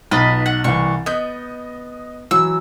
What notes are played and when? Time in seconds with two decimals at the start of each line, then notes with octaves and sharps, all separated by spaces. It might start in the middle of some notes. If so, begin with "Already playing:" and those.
0.11 B1 D#4 F4 B4 D#5 A6
0.46 F#5
0.64 C2 E3 C#6
1.06 B3 D#5 G6
2.31 E3 F#3 E6